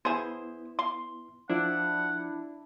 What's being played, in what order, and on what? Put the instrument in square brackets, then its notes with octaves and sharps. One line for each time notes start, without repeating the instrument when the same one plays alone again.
[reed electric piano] B3 E4 [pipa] G#4 C5
[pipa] C6
[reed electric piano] F3 [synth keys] D4 E4 [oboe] F#5